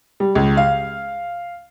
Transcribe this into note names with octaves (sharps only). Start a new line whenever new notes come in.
G3
C#2
F5